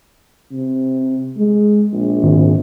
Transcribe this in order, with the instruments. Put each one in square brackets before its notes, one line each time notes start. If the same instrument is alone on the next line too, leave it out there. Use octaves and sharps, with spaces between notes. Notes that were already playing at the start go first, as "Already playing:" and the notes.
[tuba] C3
G#3
A#1
[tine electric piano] G#1